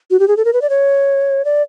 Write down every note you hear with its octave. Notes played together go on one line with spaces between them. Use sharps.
F#4
G4
G#4
A4
A#4
B4
D5
C#5
D5